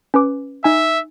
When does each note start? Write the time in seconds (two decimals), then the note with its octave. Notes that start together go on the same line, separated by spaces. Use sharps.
0.14 C#4 B4 D6
0.64 D#4 E5 G#5